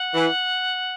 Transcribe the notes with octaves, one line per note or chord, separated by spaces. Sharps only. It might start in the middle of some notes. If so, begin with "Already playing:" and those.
Already playing: F#5
E3